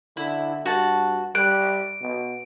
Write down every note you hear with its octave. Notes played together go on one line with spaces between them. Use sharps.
D3 E4
G2 F#4 A5
G3 F#6 D7
B2